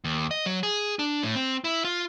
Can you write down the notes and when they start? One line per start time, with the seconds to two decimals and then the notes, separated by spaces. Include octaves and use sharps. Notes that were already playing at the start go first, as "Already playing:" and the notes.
0.04 D#2
0.31 D#5
0.46 F#3
0.63 G#4
0.99 D4
1.23 A2
1.35 C4
1.64 E4
1.85 F4